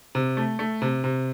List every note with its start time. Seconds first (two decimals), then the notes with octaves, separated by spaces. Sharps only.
0.15 C3
0.37 A3
0.59 A3
0.82 C3
1.04 C3